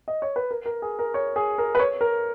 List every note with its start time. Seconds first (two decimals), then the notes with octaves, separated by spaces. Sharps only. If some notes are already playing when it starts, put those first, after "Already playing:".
0.08 D#5
0.22 C#5
0.36 B4
0.51 A#4
0.66 A#4
0.82 G#4
0.99 A#4
1.14 C#5
1.36 G#4
1.58 A#4
1.75 B4
1.80 C#5
2.01 A#4